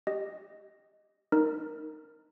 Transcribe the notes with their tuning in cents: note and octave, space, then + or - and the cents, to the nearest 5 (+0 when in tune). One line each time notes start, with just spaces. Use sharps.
G4 +0 D#5 +0
D#4 +0 A#4 +0